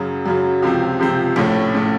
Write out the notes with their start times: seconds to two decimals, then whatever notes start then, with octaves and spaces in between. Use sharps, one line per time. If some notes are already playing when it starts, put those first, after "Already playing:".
Already playing: F#2 C#3 F#3
0.26 F#2 C#3 F#3
0.62 C#2 C3 F3 C4
0.99 C#2 C3 F3 C4
1.36 A#1 A2 A3 C#4
1.74 A2 A3 C#4